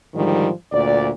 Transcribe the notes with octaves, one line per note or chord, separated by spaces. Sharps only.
G#2 D3 D#3 F3 G3
D2 A#2 D5